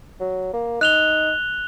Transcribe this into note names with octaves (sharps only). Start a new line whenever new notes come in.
F#3
A#3
D#4 F#6 F7 G7